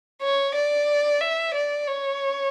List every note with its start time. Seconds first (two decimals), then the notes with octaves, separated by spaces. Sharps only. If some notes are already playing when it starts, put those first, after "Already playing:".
0.23 C#5
0.56 D5
1.22 E5
1.55 D5
1.88 C#5